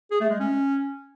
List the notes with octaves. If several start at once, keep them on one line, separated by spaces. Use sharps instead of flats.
G#4
A3
G#3
C#4